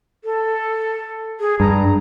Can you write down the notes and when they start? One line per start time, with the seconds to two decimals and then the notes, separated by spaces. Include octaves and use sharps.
0.24 A4
1.40 G#4
1.60 G2 A#5